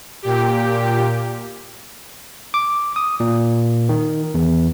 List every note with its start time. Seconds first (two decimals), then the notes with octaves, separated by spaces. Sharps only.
0.22 A#2 G4
2.54 D6
2.96 D#6
3.20 A#2
3.89 D#3
4.34 E2